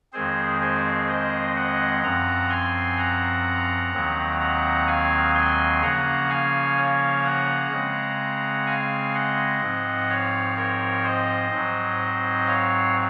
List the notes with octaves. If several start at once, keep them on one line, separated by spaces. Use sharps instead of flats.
F2 D#3 G#3 C4 G#4 C5
G#4 C5
C5 D#5
D#5 F#5
F#2 F3 C4 F#5 A#5
G#5 C6
F#5 A#5
D#2 D#3 F#3 C4
F#5 A#5
F5 G#5
G#5 C6
C#3 F3 A#3 C#4 F#5 A#5
F5 G#5
C#5 F5
F#5 A#5
C#3 G#3 C4
F5 G#5
D#5 F#5
G#2 F3 C4
C#5 F5
A#4 C#5
C5 D#5
G#2 F#3 C4
C#5 F5